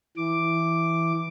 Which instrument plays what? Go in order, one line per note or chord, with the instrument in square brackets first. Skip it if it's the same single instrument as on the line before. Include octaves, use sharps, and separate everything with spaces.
[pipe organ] E3 D6